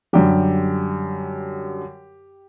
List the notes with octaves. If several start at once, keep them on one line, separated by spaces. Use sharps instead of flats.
F#2 D3 G3 G4